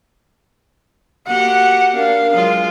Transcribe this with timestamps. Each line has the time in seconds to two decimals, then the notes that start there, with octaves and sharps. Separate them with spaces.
1.27 A#3 F#4 G4 F#5
1.96 D4 A#4 F5
2.33 F#3 G#3 F4